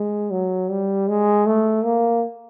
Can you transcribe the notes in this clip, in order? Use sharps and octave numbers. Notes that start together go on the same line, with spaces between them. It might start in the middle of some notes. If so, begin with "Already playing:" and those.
Already playing: G#3
F#3
G3
G#3
A3
A#3